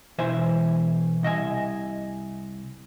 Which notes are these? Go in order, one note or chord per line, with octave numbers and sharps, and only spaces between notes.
B2 E3 C5 E5 G#5
C2 D#5 E5 G#5